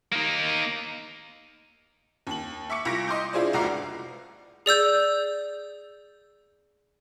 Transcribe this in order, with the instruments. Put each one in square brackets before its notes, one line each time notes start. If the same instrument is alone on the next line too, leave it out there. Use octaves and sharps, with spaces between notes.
[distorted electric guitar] A#3 D#4
[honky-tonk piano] D#2 F#7
E5 C#6 D6 C#7
C2 F4 C#6 A#6 D7
D#5 C6 D6 G6
D4 E4 F4 G#4 C5 D5
F1 C#2 F#4 A#5 D6 C7
[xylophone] G#4 D5 E6 G6